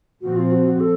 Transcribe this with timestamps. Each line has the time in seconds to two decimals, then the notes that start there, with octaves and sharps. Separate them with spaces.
0.22 A#2 F3 C4 F#4
0.37 F4
0.51 F#4
0.66 F#4
0.80 A4